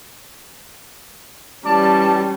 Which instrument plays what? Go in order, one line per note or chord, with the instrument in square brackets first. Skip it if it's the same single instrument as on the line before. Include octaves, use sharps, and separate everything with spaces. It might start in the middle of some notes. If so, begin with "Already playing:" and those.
[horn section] E3 D5 A5 [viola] G3 C#4